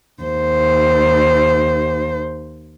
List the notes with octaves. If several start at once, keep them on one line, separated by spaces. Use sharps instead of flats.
D#2 C5